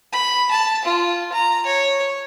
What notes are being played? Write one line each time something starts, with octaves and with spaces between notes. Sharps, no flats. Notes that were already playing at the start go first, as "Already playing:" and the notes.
B5
A5
F4
A#5
C#5